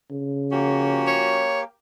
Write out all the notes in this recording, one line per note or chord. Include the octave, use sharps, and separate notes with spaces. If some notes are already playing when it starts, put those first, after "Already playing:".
C#3
F3 A#3 C#4 F#4 G4
C#5